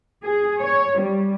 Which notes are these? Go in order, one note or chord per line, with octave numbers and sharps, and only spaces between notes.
G#4
C#5
G3